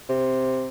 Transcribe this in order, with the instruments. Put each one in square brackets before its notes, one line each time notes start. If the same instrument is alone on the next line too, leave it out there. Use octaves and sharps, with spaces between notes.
[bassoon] C3